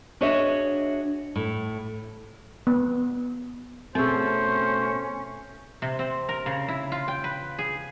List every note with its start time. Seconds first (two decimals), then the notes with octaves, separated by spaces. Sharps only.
0.21 D4 F#4 G#4 C#5 D#5 E5
1.36 A2
2.67 B3
3.95 B2 A3 C4 C#4 G#4 C5
5.82 C3
5.99 C4
6.29 A#4
6.46 C#3
6.68 E4
6.92 F4
7.08 G5
7.24 B4
7.59 G#4